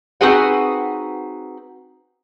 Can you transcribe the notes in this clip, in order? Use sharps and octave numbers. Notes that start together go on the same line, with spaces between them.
C4 D#4 F#4 G#4 B4 F#5